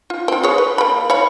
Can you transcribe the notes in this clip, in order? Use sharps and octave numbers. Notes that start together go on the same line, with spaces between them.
F4
C4 F4
G#4 B4 C#5
B4
A#3 B5
C#5 F5 B5